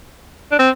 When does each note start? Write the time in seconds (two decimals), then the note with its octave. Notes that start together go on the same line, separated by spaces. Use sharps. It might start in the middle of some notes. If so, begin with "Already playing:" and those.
0.52 D4
0.59 C4